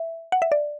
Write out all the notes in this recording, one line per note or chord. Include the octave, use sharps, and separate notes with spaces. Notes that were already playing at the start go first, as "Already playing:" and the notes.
Already playing: E5
F#5
E5
D5